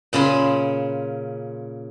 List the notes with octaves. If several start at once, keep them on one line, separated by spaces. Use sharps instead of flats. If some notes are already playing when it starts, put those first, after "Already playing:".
A#2 C#3 B5 C6